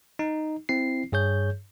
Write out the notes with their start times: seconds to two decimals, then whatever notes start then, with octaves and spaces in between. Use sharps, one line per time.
0.19 D#4
0.69 C4 E4 C7
1.12 G2 G#4 C#5 G6